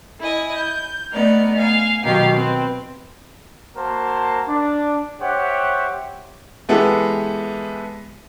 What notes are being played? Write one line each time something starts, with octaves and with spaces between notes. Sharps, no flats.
E4 D#5 G#5
G6
A3 B3 D#4 D5 F6
F5 G#5
B2 D#3 F#3 D#4 G4 F5
C4 B4
A#3 F#4 A#4 C5 A5
D4
G4 C5 C#5 E5 F#5
E3 G#3 B3 E4 G4 A4